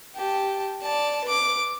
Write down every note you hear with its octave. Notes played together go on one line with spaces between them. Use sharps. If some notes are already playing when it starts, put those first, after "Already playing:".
G4 A5
D5 A5
B4 D6